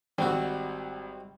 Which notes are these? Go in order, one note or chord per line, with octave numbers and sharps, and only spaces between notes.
G#1 G3 C4 F#4 G5